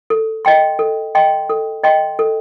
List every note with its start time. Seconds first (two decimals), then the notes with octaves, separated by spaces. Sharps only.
0.10 A4
0.45 D#5 G5 C6
0.79 A4
1.15 D#5 G5 C6
1.50 A4
1.83 D#5 G5 C6
2.19 A4